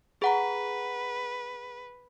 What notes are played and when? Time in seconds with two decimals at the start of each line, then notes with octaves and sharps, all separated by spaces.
0.22 G#4 B4 F#5 A#5